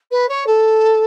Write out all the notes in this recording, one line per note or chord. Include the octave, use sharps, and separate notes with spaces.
B4
C#5
A4